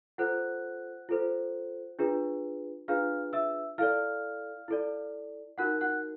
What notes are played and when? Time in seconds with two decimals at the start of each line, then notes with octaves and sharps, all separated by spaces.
0.18 F4 A4 C5 F#5 F#6
1.09 F4 A4 C5
1.99 D4 F4 G#4 B4
2.88 D4 F4 G#4 B4 F5 F6
3.33 E5 E6
3.78 E4 A4 D5 F5 F6
4.68 E4 A4 D5
5.58 D#4 F#4 A#4 F#5 F#6
5.81 F#5 F#6